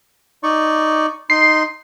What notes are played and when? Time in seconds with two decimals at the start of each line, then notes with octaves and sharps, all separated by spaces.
0.43 D#4 D5 C#6
1.30 D#4 C6 C7